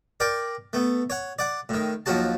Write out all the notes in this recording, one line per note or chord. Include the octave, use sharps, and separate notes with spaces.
A#4 D5 G5
A3 B3
C#5 F#5
D5 F#5
A2 D#3
D#2 F3 F#3 F#4 A5